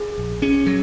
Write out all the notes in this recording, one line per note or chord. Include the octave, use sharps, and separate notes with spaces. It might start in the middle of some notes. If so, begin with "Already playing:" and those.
Already playing: G#4
A#1
C#4 G#4
F#3